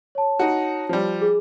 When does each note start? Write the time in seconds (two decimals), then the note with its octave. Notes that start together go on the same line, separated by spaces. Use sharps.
0.15 C#5 A5
0.39 D#4 F#4
0.89 F3 G3
1.21 G#4